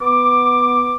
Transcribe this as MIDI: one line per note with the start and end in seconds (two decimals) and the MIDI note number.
0.01 0.96 59
0.01 0.96 86